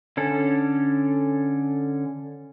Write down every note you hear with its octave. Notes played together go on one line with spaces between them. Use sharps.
D3 C#4 A4